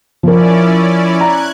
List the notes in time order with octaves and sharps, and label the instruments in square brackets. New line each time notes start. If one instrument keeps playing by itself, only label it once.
[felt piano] F3 A#4 [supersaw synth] C#4 E4 D5
[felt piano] A#5 [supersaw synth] F#6 G#6